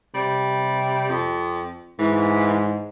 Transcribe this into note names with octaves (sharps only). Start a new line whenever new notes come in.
C3 G3
F2
G#2 E3